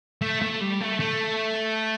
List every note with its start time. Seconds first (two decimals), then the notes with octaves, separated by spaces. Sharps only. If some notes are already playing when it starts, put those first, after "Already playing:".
0.22 A3
0.42 A3
0.61 G3
0.81 A3
1.00 A3